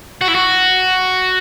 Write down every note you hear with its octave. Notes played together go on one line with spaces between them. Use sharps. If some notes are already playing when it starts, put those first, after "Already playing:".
F#4
E4
F#4